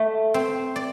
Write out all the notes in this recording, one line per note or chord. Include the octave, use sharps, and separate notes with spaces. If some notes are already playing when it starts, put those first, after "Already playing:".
Already playing: A3
C4
D5